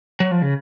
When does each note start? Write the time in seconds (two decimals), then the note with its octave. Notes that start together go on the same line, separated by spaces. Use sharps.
0.20 F#3
0.31 F3
0.42 C#3